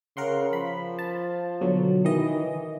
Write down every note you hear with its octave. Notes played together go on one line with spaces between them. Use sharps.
C#3 A#4 F#5 C6
F3 B5
A5
B2 D3 F#3
D#3 E3 D#5